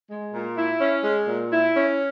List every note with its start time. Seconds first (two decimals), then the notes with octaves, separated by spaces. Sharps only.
0.09 G#3
0.33 A#2
0.56 E4
0.79 C#4
1.03 G#3
1.27 A#2
1.50 E4
1.75 C#4